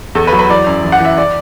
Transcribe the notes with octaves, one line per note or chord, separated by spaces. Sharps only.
E2 A4
B4
F#3
B4
E3 D5
F#2
E3
F#5
E3 E5
D5